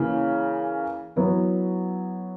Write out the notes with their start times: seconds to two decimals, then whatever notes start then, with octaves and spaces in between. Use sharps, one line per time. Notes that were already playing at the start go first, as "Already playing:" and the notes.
Already playing: C#3 E3 A#3
1.16 F#3 B3 E4